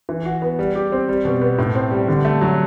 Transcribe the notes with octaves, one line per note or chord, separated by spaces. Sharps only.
E3
F#4
B3
G3
G4
C4
G3
B2
B3
A2
C4
G3
D3
A3
F#3